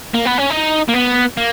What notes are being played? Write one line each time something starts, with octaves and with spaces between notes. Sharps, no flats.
A#3
B3
C#4
D#4
A#3
B3
A#3